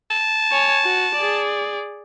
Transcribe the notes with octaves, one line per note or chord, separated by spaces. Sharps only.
A5
C#5 G#5
F#4
G#4 D5